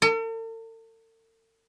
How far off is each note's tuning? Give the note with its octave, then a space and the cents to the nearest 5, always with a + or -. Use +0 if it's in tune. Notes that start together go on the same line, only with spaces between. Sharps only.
A4 +45